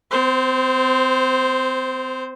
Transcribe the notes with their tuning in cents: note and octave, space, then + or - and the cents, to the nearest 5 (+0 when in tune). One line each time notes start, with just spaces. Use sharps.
C4 -30 C5 +0